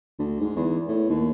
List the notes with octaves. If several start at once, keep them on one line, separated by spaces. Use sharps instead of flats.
D2
G#2
E2
A2
D#2